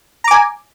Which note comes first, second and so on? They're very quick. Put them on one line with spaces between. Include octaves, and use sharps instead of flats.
A#5 D6 G#5